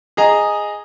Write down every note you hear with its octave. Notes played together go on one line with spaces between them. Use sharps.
G#4 D#5 A#5